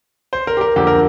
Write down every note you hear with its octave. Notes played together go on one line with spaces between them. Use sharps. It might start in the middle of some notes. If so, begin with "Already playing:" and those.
C5
A#4
G4
A#4
F2 D3 A#3 G4
A#4